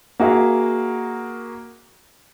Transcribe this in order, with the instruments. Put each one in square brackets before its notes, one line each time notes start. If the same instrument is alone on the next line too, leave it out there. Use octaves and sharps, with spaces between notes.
[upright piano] A#3 F#4 G#4 E5 F5